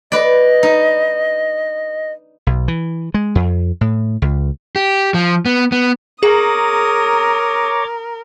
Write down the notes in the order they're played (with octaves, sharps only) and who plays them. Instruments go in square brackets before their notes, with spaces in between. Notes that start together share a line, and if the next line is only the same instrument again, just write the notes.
[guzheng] B4 D5 [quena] D#5
[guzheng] D#4
[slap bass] B1
E3
G#3
F2
A2
C#2
[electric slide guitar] G4
F3
B3
B3
[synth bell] G#4 [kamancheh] A#4 [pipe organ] C#5 A#5 D6 [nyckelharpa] D#6